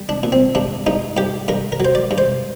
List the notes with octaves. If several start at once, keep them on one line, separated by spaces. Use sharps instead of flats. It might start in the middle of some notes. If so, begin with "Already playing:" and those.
Already playing: G3
D4
A#2
C4
G2 D4
G2 D#4
G2 G4
G2 A#4
A#4
F#3 C5
D5
G2
C5